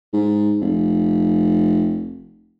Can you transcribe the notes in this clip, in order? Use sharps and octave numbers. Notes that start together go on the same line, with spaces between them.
G#2
F1